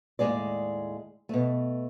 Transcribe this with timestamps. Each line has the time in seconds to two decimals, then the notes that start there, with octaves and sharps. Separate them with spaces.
0.19 D#2 A2 E3 G#3 G#4 D5
1.29 B2 A3